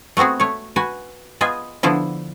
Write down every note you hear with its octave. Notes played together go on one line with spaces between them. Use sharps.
A3 B3 C4 F#4 G#4
A3 C#5
F#4 B4 G#5
B3 F4 G#4 D#5 G#5
D3 F3 B3 E4